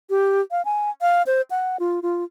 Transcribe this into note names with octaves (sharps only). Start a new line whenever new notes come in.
G4
F5
G#5
F5
C5
F#5
F4
F4